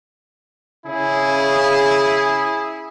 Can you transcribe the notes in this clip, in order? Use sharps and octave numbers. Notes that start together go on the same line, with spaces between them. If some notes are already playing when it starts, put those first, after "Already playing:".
C#3 E4 G#4